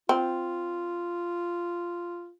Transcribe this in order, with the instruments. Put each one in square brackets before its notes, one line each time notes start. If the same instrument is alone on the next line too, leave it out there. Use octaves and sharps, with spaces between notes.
[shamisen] C4 [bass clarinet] F4